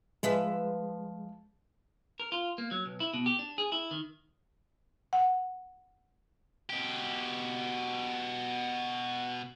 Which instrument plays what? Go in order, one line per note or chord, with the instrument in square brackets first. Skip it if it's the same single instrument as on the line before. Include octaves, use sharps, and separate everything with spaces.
[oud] F3 B4 E5 [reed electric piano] G#3
[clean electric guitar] A#4
F4
A#3
F#3
B1
E4
B2
G4
D4
G#4
E4
D#3
[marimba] F#5
[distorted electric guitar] B2 G4